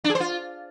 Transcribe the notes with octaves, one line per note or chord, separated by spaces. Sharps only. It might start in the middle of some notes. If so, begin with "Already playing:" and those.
D4
G#4
C5
F4